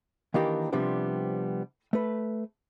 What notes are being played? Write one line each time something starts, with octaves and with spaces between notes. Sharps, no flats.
D#3 E3 A#3 D4 G4 A#4
C3 F3 G3 B3 D4
A3 B4